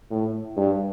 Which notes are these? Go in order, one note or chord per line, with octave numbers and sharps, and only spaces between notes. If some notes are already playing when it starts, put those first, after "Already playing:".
A2
G2